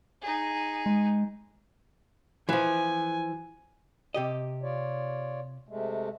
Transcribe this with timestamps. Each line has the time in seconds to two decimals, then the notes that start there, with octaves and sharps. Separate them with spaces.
0.22 D#4 G#4
0.86 G#3
2.49 E3 F3 G#5
4.14 C3 G4 D#5
4.62 F4 C#5 D5
5.69 C3 G#3 A3